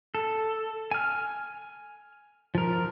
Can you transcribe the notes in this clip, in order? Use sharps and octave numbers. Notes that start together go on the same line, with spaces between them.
A4
G#5 F6
F3 A#4